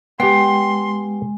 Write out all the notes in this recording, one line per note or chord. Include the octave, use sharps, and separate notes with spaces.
G#3 B3 G4 G5 C6